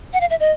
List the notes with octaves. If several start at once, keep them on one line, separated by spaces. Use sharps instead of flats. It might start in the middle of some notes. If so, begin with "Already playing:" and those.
F#5
F5
E5
D#5